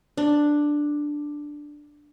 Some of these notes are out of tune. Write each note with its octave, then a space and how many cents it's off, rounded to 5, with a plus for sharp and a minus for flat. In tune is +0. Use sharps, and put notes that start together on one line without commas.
D4 +5